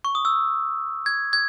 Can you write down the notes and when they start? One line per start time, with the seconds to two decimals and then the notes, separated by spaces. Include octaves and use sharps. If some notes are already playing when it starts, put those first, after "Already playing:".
0.05 C#6
0.15 D#6
0.25 E6
1.06 G#6
1.33 G#6